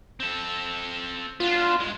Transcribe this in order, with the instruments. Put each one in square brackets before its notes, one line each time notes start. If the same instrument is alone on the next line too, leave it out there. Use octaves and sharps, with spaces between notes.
[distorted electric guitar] C4 A4
[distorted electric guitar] B3 D4 [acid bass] F4
[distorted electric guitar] G2 G#3